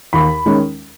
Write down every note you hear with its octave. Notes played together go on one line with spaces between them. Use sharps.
D#2 B5
D#3 G#3 C#4